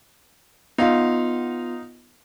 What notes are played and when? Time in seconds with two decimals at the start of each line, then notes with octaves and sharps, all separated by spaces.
0.78 B3 D#4 F4 F5